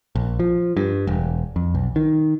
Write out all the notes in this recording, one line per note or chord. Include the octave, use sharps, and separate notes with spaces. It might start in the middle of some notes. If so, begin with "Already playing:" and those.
A#1
F3
G2
E1
F2
B1
D#3